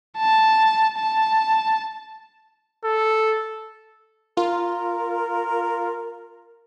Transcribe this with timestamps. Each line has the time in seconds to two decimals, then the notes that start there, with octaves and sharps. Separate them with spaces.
0.17 A5
0.98 A5
2.84 A4
4.37 F4 A#4